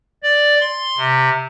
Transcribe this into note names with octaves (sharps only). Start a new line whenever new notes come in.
D5
C6
C3